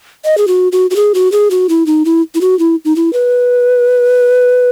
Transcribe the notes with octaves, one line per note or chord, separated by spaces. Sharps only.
D#5
G#4
F#4
F#4
F#4
G#4
F#4
G#4
F#4
E4
D#4
E4
E4
F#4
E4
D#4
E4
B4